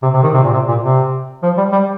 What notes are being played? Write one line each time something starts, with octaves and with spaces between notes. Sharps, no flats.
C3
C3
D#3
C3
A#2
C3
A#2
C3
F3
G3
G3